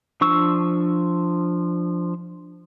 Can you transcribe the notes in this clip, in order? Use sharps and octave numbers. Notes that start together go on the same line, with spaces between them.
F3 D4 C#6 E6